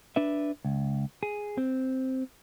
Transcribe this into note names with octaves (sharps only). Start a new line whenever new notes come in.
D4 B4 E5
C#2
G#4
C4